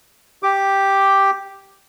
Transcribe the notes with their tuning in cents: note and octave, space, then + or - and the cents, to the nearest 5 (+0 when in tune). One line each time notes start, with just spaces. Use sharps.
G4 +0 D6 +0